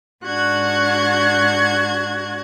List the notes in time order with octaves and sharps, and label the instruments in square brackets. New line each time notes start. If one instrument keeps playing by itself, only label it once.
[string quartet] G#2 D4 F#4 F#6 G#6